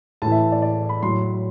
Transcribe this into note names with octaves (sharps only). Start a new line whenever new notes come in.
A2 E3 A5
E5
D5
D5
B5
A2 F#3 C6